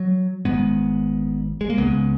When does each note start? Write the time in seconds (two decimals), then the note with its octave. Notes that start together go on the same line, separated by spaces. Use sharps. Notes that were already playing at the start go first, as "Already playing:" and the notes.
Already playing: F#3
0.45 G#1 G#2 G#3 B3
1.61 G#3
1.70 A#3
1.78 C#2 C#3 G#3 B3